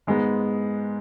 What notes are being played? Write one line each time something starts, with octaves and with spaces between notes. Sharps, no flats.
G#2 G#3 B3